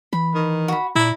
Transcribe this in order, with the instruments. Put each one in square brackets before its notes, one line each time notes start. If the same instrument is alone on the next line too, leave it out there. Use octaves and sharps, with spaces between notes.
[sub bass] E3 [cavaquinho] B5
[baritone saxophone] D#3
[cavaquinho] F#4 B5
[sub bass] A#2 [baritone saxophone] E4 [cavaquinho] D5 A#5